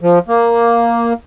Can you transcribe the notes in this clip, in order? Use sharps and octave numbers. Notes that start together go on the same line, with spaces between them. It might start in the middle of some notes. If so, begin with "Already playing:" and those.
F3
A#3